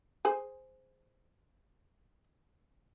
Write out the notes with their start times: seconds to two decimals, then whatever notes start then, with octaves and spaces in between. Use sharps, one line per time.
0.25 G#4 C5 G#5